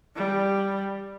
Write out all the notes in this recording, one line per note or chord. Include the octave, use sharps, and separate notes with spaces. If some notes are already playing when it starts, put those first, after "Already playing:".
G3